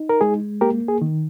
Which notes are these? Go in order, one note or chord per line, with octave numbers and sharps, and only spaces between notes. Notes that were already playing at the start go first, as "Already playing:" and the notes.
Already playing: D#4
A#4
G#3 G#4
A#3 G4 A#4
G#4
D#3